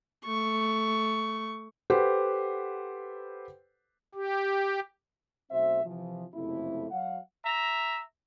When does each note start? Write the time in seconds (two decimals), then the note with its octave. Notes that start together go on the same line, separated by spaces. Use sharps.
0.25 A3 C#6
1.90 G4 A4 B4 C5 F#5
4.15 G4
5.51 B1 A3 C4 F#4 C5 E5
5.84 C3 E3 F3
6.33 F#1 F2 C3 A3 E4
6.90 F#3 F5 F#5
7.45 E5 A#5